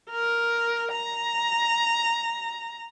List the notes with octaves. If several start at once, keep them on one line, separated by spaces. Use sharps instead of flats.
A#4
A#5